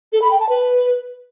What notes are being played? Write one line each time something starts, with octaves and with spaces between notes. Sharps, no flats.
A4
B5
G5
A5
B4